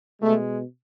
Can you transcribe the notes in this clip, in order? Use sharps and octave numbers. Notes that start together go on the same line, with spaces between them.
B2 G#3 A3